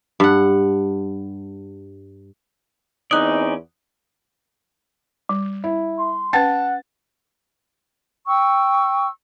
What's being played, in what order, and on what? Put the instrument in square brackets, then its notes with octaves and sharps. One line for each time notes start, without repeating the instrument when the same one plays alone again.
[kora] G2 F#5
[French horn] E2 [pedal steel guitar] C4 C#4 D5 [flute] D#4 [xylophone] D#6 F#6
[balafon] G3
[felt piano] E4
[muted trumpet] C6
[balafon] C#4 B4 G5 [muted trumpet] F#5 [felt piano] A5 A6
[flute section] G5 C#6 E6